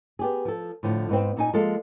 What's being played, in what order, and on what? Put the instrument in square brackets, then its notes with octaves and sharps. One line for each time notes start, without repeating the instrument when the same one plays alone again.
[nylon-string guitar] B3 G4 G#4
F3 A4
A2 D3 F3
G#2 B3 C4
A#2 D#4 G#5
F3 G#3 A#3 F4 A4 F5